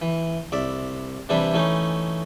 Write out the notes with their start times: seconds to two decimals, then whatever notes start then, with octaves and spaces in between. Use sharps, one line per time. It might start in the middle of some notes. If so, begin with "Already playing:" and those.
0.02 E3
0.52 C2 D5 E5
1.29 C3 E3 G3 D4 E4
1.54 E3 A3 C#4 D#4